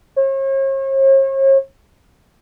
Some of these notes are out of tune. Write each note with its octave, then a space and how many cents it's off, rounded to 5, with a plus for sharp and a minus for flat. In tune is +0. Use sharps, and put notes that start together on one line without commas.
C#5 -45